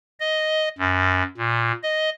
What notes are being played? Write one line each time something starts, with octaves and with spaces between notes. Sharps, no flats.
D#5
F#2
A#2
D#5